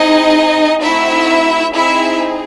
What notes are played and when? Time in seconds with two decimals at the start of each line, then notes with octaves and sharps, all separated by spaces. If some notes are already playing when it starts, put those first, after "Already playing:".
Already playing: C4 D#4 E4 G#4 D#5
0.82 A3 C4 D#4 E4 F#4 E5
1.74 C4 D#4 E4 G#4 E5